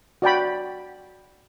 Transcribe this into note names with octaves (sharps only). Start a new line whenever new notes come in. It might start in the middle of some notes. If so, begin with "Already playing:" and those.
F#4 D5 G5 B5